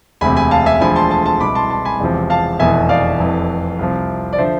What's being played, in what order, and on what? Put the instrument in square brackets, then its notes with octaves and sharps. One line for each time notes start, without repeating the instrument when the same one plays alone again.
[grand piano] E1 D2 C3 G#5 B5
G#5 B5
F5 A5
E5 G#5
E1 D2 D3 F3 G#5 B5
A5 C6
A5 C6
A5 C6
C2 B2 B5 D6
A5 C6
A5 C6
G#5 B5
E1 E2 C3 F3
F5 A5
F1 E2 B2 E5 G#5
D5 F5
F1 F2 E3
C2 C3 F3
D5
D3 F3 C5 E5